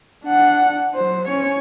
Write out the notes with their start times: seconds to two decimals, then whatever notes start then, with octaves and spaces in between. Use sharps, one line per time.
0.24 D4 F#5
0.95 F#3 C5
1.28 C#4 C#5